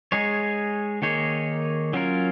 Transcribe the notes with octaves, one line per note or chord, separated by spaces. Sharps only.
G#3 D#4 G#4 C#5
D#3 A#3 D#4 G#4 C#5
F#3 C#4 F4 A#4